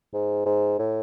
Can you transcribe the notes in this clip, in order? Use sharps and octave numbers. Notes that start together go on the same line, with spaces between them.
G#2
G#2
A2